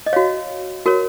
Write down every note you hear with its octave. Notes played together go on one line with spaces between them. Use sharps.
D#5
F#4 C#5 F5
F#4 A#4 C#5